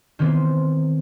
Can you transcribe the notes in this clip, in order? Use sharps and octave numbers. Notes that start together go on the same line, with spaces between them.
D#3 E3 B3 C4